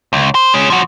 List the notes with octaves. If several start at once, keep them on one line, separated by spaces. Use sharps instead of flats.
C#2
C5
G#3 C#4
F3 F#4